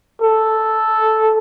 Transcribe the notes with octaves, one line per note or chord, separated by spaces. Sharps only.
A4